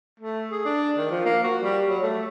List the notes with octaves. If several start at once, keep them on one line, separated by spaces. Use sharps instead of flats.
A3
G#4
D4
D#3
F3
A#3
F#4
G3
F#3
A3